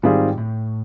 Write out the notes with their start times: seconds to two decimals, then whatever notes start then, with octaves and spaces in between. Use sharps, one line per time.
0.03 G#2 D#3 G3 C4 F4 G#4
0.38 A2